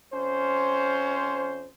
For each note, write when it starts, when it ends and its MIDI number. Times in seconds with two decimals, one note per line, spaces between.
0.14 1.70 41
0.14 1.70 61
0.14 1.70 72